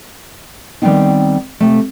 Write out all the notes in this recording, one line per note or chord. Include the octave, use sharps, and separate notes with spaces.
D#3 G3 A3 B3 C4 D#4
C3 A3